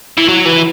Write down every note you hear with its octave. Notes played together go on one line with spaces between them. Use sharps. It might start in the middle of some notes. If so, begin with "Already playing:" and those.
E3
F#3
E3